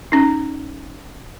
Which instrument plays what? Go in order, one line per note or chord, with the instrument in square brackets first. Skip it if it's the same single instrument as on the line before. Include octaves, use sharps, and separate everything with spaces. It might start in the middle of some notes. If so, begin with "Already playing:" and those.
[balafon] C#4 D#4